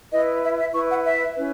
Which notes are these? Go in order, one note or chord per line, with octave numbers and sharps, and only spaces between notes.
E4 B4 D#5
E5
E5
E4 B4 C#6
F#5
E5
C#4 E4 B4